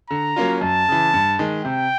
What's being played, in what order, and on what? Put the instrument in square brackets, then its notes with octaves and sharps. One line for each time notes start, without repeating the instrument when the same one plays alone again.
[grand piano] D3 [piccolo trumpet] A#5
[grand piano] F#3 A#3 C#4 F4
[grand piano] F#2 [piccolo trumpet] A5
[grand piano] C#3 E3
G2
D#3 G#3
[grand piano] C3 [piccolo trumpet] G5